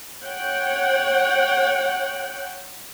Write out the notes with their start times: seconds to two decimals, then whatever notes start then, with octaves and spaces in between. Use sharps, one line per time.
0.26 C#5 F#5 G5